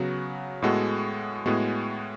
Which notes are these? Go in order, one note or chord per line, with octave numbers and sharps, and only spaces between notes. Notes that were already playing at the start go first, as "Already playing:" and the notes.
Already playing: C#3 F#3 B3 F#4
A2 G#3 B3 F#4 A4
A2 G#3 B3 F#4